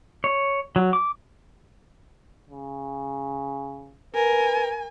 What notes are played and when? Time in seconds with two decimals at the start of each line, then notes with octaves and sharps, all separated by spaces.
0.24 C#5
0.76 F#3
0.93 D6
2.50 C#3
4.15 A#4 B4 G#5